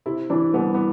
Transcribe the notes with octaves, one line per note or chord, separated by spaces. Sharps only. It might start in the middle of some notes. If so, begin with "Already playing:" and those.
C3 E4
E3 D4
C2 B3
B3